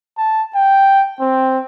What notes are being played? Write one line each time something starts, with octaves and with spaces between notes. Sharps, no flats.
A5
G5
C4